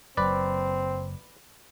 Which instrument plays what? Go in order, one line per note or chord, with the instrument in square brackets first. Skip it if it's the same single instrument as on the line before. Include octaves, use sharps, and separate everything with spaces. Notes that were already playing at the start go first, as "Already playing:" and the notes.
[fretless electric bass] F#1 F#3 [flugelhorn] C4 [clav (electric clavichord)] B4 D5